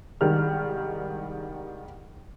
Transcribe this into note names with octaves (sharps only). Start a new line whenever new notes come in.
C2 D#3 G3 G#3 F6